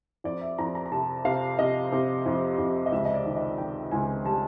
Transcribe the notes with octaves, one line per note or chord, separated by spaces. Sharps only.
F2 D5
E5
F2 A#5
A#5
A#5
C3 A5
C3 F5
C3 D#5
C3
F2
F2
D#5
C#2 E5
D#5
D5
D#3
D#5
D#3 G5
C#2 G#5
G3 A5